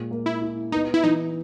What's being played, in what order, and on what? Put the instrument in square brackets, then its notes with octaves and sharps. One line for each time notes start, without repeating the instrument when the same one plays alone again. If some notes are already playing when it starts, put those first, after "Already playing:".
Already playing: [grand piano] A#2 G#3
A#3
[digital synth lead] E4
[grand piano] E4
[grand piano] B3 [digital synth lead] D#4
[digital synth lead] E4
[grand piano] E3 [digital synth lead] D#4